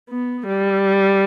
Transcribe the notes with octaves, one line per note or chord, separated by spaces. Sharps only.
B3
G3